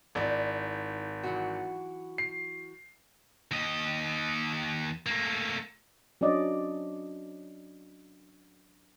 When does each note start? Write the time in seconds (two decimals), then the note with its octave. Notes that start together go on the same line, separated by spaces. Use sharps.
0.15 G#1 D#4 E4 D5
1.23 E3 F#3 F#4
2.18 C7
3.51 D#2 D#5
5.06 A3 A#3
6.21 F#3 C#4 D4 D5 D#5